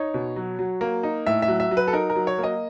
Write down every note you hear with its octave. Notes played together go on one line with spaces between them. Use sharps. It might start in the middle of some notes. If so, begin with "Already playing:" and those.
Already playing: D#4 C#5
B2
F#3
F#3
A#3
D#4
A2 E5
E5
F#3
E5
F#3
B4
A4
D#4 A#4
A#4
F#3
C#5
A#3
D#5